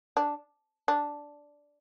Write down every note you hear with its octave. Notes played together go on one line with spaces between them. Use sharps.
D4
D4